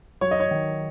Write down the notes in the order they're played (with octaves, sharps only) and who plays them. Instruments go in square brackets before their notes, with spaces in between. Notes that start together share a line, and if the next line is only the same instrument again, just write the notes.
[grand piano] F#3 C#5
D#5
C#5
D#3